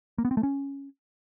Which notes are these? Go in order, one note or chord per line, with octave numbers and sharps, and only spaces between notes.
A#3
B3
C4
A3
C#4